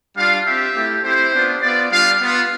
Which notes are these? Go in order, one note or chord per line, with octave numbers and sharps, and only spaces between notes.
G3 D4 F4 F5
C4 G4 E5
A3 E4 G4
C4 E4 G4 C5
B3 D4 F4
B3 F4 D5
G3 D4 F4 F5
B3 F4